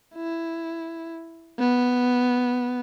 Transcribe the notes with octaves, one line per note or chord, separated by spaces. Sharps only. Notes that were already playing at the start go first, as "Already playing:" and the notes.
E4
B3